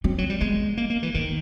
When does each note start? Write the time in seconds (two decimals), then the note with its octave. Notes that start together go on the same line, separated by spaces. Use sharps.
0.04 F#3 C4
0.18 F#3
0.30 G3
0.40 G#3 B3
0.77 A#3
0.90 A#3
1.03 E3
1.14 D#3 B3